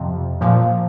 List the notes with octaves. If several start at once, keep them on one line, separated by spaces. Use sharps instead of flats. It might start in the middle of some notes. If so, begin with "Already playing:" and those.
Already playing: F2 C3 F3
A#2 F3